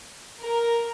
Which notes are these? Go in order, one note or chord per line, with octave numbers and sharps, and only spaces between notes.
A#4